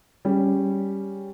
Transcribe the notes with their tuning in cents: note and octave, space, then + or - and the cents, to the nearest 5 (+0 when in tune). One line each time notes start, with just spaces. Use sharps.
G3 +0 C#4 +0 G#4 +0